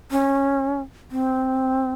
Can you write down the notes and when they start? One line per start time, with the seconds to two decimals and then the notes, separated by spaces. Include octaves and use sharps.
0.11 C#4
1.11 C4